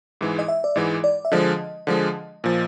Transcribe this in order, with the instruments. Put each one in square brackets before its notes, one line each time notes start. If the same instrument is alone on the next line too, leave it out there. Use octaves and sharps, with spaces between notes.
[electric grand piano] G#2 E3 G#3
[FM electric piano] D#5
E5
D5
[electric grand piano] G#2 E3 G#3 [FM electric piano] D#5
[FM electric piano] D5
E5
[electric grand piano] D3 F3 G#3 [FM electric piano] D#5
[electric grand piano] D3 F3 G#3
A#2 F3